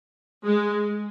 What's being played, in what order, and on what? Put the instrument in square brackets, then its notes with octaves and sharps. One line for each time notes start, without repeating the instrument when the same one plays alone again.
[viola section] G#3